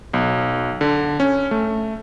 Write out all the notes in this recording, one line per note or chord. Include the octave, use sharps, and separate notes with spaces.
B1
D3
C#4
A3